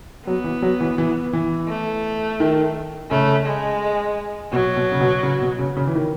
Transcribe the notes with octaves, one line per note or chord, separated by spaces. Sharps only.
F#3 B3
E3
F#3
E3
E3
E3
A3
D#3
C#3 A3
G#3
B2 F#3
B2
C#3
B2
C#3
B2
C#3
C#3
E3
D#3